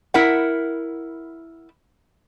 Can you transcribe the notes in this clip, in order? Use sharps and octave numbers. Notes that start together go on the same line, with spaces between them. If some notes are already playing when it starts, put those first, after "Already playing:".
E4 A#4 F#5